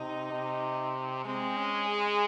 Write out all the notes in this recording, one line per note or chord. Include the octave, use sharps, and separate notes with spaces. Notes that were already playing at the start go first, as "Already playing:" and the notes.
Already playing: C3 D#4
C3
G#3 C4
C#4
G#4